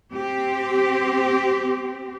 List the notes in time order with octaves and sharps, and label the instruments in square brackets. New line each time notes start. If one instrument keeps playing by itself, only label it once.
[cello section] C4 G4